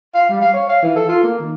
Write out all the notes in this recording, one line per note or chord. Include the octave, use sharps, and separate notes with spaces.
F5
G3
F5
C#5
F5
E3
A4
F4
A#3
D#3